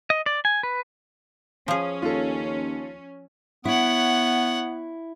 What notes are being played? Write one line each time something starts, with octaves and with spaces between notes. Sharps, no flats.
D#5
D5
G#5
B4
F3 C#4 G#4
D#2 F4 A4
B3 E4 C#5 F#5